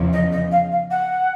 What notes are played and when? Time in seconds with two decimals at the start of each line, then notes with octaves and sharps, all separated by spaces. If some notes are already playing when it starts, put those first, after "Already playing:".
Already playing: E2 C#3 F3
0.13 D#5
0.32 D#5
0.51 F5
0.71 F5
0.90 F#5